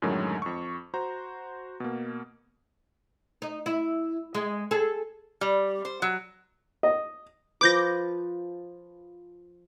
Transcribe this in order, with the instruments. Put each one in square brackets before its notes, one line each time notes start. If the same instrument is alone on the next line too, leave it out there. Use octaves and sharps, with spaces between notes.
[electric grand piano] F#2 A2 D3 D#3 F#3 G#3
F2 C#6
F#4 C5 A#5
B2 A#3
[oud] D#4
E4
G#3
G#4 A4
[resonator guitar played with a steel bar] G3
C5
F#3
[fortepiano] D#5
[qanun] F3 B4 [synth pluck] D6 G6 A#6